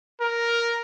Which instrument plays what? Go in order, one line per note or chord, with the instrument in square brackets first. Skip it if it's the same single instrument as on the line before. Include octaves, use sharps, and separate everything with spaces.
[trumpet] A#4